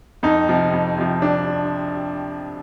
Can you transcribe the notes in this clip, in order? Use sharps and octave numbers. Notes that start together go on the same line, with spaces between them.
F2 D#4
C3 F3
F2
C3 F3
D4